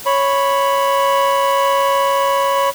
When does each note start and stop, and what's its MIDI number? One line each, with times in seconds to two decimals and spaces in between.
0.06 2.69 73
0.06 2.69 83